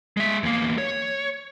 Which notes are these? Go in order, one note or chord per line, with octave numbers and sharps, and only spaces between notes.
G#3 E5
E2 A#3
C#5